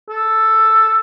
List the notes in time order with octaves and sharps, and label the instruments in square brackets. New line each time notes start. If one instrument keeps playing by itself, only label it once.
[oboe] A4